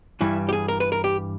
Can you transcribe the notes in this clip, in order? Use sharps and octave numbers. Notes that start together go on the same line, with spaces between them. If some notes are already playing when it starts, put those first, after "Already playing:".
G2 E3 G3 E4
G4
G#4
A#4
B4
A#4
G4